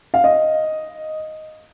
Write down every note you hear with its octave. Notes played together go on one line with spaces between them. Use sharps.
F5
D#5